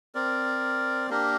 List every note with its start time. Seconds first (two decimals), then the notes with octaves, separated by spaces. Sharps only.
0.15 C4 A#4 D5
1.09 A#3 D4 G4 A#4